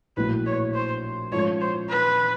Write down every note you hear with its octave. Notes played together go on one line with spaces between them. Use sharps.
A#1 A2 F#3 A#3 B4
C#5
C5
G#2 F3 A3 C#4 F4 C#5
C5
B4